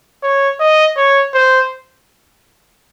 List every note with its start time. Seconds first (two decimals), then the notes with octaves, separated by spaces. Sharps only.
0.23 C#5
0.60 D#5
0.97 C#5
1.34 C5